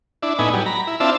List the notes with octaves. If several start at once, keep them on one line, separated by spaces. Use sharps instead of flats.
D4 E4
A2 B3 D#4 G#5
F#3 G3
A#5 B5
E4
C4 D4 E4 F4 E5 A5